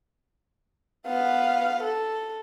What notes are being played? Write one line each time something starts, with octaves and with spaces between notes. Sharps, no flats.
B3 F5
A4